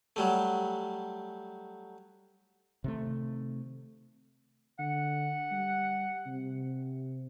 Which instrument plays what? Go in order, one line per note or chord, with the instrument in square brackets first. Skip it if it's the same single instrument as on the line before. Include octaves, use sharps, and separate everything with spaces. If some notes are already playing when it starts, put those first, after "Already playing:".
[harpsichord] F#3 G3 A3
[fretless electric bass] C3 D#3 A3
[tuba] D3 [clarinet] F#5
[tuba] G3
C3